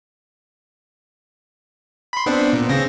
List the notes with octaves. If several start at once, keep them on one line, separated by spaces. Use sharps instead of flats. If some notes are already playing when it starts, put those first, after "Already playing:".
B5 C6
B3 C4 D4
A#2
C#3 C4 A#6